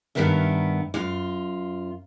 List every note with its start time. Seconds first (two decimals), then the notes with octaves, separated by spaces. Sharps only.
0.15 G2 C3 D#3 B3 A#4 E5
0.94 F#2 F4